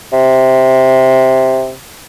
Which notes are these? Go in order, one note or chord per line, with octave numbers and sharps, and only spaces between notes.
C3